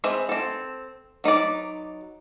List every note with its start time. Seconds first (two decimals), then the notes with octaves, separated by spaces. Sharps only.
0.04 G#3 C4 G#4 B4 E5
0.29 C4 A4
1.24 F#3 D#4 B4 D5